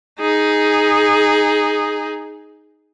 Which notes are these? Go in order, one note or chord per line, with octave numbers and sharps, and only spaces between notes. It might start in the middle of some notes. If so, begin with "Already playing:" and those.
D#4 G#4